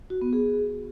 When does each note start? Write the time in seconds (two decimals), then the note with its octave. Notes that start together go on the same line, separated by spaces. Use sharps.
0.10 F#4
0.21 B3
0.33 G#4